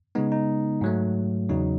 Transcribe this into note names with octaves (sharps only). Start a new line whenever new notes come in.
C#3 G#3 B3 D#4
D#4
G#2 F#3 A3
E2 C#3 F#3 D#4